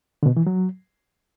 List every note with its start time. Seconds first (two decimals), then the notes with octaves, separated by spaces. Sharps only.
0.23 D3
0.26 B2
0.37 E3
0.47 F#3